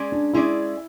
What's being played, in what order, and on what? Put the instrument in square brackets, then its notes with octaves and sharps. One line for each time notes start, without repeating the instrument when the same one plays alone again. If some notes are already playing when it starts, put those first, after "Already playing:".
Already playing: [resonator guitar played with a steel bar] G#3 C#4 G#4 D5
[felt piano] D4
[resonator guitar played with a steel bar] G#3 C#4 G#4 D5 [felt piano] E4